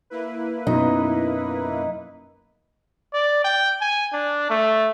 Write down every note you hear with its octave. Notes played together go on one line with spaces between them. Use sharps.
A#3 E4 B4
F#2 B2 D#4
D5
G5
G#5
D4
A3